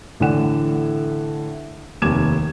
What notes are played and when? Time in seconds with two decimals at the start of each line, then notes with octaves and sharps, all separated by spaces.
0.20 A2 D3 E3 D4 F#5 E7
2.02 F1 D#2 D6 G#6 E7